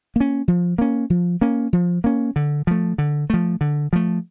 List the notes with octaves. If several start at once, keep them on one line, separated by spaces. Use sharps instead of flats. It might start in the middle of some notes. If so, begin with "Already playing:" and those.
A#3 C#4
F3
A#3 C#4
F3
A#3 C#4
F3
A#3 C#4
D3
F3 A3
D3
F3 A3
D3
F3 A3